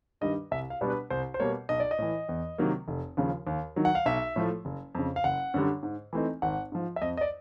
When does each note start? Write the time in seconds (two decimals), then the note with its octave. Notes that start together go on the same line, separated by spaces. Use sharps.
0.21 G2 D#3 G3 D#5
0.51 C2 E5
0.70 F5
0.81 B2 G3 B3 D4
0.90 B4
1.10 C2 C5
1.34 C5
1.40 B2 G3 A#3 C#5
1.69 B1 D#5
1.80 D5
1.91 D#5
1.99 A2 E3
2.29 E2
2.58 C3 D#3 F#3 A#3
2.88 F1
3.17 D#2 C#3 F3
3.47 D#2
3.76 D#3 F#3
3.85 F#5
3.95 F5
4.06 B1 E5
4.36 A2 F3 A3
4.65 F#1
4.95 F2 C#3
5.16 F5
5.24 F#1 F#5
5.54 F#2 D3 G3
5.83 G#2
6.13 E3 A3 C4 D#4
6.42 G#1 F#5
6.72 G#2 F3
6.96 E5
7.02 F2 D#5
7.17 D#5
7.21 D5